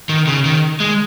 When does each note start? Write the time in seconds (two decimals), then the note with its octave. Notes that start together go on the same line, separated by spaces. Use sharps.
0.09 D#3
0.27 C#3
0.45 D#3
0.80 G#3